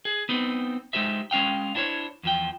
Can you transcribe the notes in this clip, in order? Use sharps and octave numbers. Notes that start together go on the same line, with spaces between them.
G#4
B3 C4 D#4
G#3 D#4 G4 C5 E5
G#3 C#4 F5 G5
D4 E4 C5 C#5
E2 F3 G5